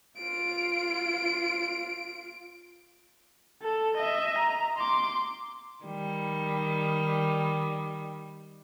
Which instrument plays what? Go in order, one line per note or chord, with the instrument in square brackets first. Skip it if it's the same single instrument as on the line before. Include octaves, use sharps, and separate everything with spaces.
[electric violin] F4 D7
A4
D#5 E5
A#5
C6 D6
[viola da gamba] D#3 G3